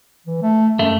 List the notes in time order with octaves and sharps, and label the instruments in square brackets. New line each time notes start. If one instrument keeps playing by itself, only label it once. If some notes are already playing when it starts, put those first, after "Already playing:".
[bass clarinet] E3
A3
[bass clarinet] F#2 [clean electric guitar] A3